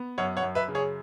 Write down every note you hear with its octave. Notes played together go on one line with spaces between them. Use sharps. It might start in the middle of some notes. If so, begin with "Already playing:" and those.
Already playing: B3
F#2 C#5 F#5
C#5 F#5
F#2
B4 E5
C#3
G#4 C#5